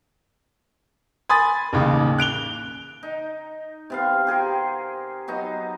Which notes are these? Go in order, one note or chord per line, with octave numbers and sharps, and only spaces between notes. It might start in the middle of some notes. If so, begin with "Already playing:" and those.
G#5 B5 C6 D#6 A6
A1 D#2 C#3
F#6 D7 F7 G7
D#4
C3 B3 F5
G4 G#4 A#4 C5
F#3 B3 D#4